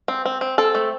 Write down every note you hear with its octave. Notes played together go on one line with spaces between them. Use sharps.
C4
C4
C4
C4 A4
A3